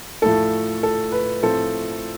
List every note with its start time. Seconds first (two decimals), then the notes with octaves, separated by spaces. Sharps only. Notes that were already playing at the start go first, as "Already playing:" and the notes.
0.22 A2 F3 A3 A4
0.83 A4
1.12 B4
1.42 A2 F3 A3 C4 A4